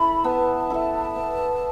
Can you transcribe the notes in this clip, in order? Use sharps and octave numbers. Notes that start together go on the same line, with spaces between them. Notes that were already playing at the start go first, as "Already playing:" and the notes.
Already playing: E4 A4 E5 B5
B3 A5
E4 A4 E5
B3